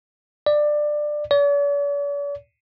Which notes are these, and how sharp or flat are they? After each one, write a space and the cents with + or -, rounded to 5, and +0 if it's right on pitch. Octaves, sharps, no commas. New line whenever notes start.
D5 +20
D5 -45